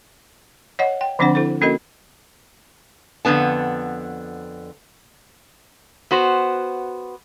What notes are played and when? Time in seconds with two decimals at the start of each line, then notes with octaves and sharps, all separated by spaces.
0.79 C#5 D#5 F#5
1.01 G5
1.19 D3 F3 C4 D4 C5 F#5
1.35 E4 A4 C5
1.61 A#3 C#4 F#4 A4 A#4 D#5
3.25 F2 G#2 D3 B3 A5
6.11 B3 F#4 C5